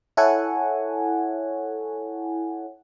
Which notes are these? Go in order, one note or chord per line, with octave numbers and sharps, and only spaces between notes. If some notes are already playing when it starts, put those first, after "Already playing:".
E4 A4 C#5 F#5 G#5